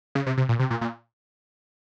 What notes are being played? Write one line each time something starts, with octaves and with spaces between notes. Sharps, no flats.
C#3
C3
C3
A#2
C3
A#2
A#2